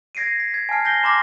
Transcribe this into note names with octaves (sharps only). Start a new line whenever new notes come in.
G#6 A#6 C7 D7 D#7
B6
G#6
G#5 A5 F6 C7
G6 A#6 C7 G7
A#5 C6 D6 F6 A#6